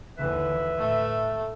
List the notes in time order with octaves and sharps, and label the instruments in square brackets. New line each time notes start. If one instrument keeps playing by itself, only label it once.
[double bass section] D#2 D3 E3 [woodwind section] B4 E5
[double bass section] A2 [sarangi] A3